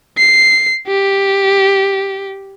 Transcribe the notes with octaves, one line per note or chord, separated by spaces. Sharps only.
C7
G4